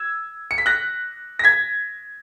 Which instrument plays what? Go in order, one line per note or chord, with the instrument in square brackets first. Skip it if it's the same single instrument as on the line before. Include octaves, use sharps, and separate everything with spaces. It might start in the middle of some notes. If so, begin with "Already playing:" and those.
Already playing: [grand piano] E6 G#6
C#7
B6
F#6 A#6
A#6
G#6 B6